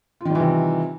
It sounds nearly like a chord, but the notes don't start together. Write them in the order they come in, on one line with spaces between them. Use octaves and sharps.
F4 D#3 G3 E3 C3